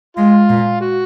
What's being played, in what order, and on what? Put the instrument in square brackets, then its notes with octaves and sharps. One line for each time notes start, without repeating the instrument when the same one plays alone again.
[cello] G#3 [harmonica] F4
[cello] A#2
[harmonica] F#4